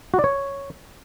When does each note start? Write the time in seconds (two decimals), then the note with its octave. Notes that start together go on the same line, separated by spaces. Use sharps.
0.14 F#4
0.19 D5
0.24 C#5